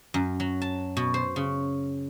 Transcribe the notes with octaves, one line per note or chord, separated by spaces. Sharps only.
F#2
F#3
A5
B2
C5
C#3